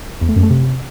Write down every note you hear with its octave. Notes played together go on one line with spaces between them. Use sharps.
E2
A3
F#2
A3
C3